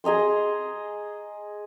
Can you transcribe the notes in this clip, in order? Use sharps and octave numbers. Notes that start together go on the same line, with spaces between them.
G#4 D#5 A#5 C6